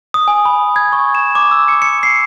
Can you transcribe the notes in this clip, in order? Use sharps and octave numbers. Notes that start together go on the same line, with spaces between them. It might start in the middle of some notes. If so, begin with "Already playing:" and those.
D#6
G#5
B5
G#6
C#6
E7
D6
E6
C#7
C#7
C7